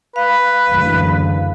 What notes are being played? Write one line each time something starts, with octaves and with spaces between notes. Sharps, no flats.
B4 F5
F#1 D2 E3